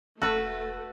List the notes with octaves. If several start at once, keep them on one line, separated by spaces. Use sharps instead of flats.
E1 A3 F#4 A4 B4 A5